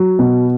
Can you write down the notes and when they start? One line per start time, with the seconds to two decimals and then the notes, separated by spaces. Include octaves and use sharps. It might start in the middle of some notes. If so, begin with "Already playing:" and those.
Already playing: F#3
0.19 B2